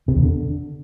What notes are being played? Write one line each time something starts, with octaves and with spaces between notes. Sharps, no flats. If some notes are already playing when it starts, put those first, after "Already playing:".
C3
E2
D3